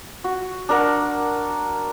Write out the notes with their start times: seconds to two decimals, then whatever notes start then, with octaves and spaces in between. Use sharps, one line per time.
0.24 F#4
0.69 D4 A#4 F#5